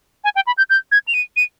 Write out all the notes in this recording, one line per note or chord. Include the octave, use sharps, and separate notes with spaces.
G#5
G5
B5
G6
G6
G#6
F7
D#7
D#7